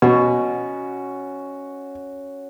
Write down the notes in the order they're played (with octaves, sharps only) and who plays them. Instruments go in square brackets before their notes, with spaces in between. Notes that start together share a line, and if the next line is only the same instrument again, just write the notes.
[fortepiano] B2 [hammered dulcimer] C#4 F#4